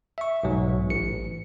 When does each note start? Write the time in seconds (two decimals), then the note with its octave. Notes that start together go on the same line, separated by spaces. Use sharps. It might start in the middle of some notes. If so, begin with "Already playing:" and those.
0.18 E5 C#6
0.43 B1 G#2 F#3
0.90 A1 C#7